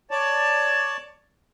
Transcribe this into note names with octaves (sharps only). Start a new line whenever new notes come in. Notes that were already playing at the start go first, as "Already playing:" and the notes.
C#5 D5 A5